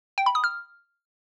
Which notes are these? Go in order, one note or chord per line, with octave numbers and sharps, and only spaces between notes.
G5
B5
D#6
F6